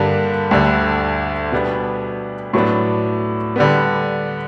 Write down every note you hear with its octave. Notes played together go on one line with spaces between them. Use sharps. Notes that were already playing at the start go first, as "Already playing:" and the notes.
Already playing: G2 D3 G3 A#3
D2 D3 G3
B2 G3 B3 D4
A2 F#3 B3 D4
D3 G3 B3